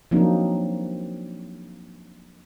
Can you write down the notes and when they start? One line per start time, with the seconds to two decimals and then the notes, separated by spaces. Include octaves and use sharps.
0.11 F3 F#3 A#3 C4 D4 D#4